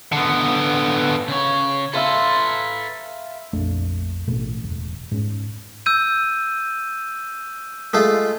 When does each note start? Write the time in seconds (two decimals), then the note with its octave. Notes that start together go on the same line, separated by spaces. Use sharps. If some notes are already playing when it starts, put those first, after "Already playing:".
0.12 D3 B3
1.28 C#3 C#5
1.93 A4 B4 E5 F5 C6
3.53 A#1 F2 A3 D4
4.27 A1 B2 A3
4.64 E1 C2
5.11 G#2 C#4
5.86 E6 G6 D#7
7.93 G#3 A3 F4